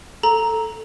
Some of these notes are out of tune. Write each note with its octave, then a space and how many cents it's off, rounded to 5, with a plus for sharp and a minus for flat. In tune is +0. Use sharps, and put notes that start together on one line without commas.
A4 +0 A#5 +5